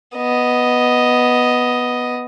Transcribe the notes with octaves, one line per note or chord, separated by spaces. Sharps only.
B3 D#5